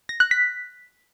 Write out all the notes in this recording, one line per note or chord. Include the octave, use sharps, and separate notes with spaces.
A#6
F#6
B6